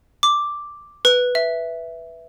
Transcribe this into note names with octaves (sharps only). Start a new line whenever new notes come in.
D6
B4
E5